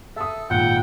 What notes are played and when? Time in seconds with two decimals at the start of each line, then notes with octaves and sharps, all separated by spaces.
0.16 A4 E5 D#6
0.50 G#1 A#2 F#5 G5